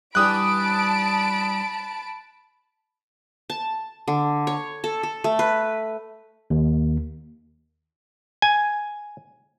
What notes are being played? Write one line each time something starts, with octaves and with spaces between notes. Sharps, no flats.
G2 E3 G3 A5 B5 D#6 F#6 D7
A5
D3
C#5
A4
A4
A3
B4
D#2
G#5